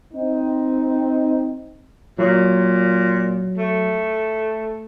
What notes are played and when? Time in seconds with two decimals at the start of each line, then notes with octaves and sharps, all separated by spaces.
0.13 C4 D#4
2.19 A#2 F#3
3.57 A3